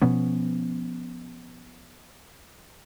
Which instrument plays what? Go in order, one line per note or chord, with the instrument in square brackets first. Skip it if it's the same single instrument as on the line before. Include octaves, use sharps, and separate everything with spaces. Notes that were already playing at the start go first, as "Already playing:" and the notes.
[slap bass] B2 F3 B3 C#4